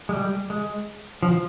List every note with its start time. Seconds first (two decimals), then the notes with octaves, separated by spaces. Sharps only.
0.09 G#3
0.13 G3
0.50 G#3
1.23 F3